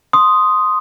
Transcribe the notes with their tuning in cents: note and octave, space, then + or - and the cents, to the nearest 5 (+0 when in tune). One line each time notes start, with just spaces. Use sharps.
C6 +0 D#6 +0